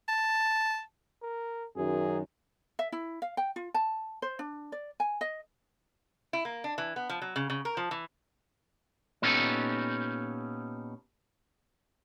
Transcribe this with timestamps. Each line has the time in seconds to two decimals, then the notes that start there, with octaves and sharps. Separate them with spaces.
0.08 A5
1.22 A#4
1.77 F#2 D#3 G#4
2.79 E5
2.92 E4
3.22 F5
3.37 G5
3.56 F4
3.74 A5
4.22 C5
4.39 D4
4.72 D5
5.00 G#5
5.21 D#5
6.33 E4
6.45 A#3
6.64 D4
6.78 E3
6.96 B3
7.09 F3
7.22 F#3
7.36 C#3
7.50 C#3
7.65 A#4
7.77 F3
7.91 E3
9.22 A#2 B3 C#4 D#4 G4 A4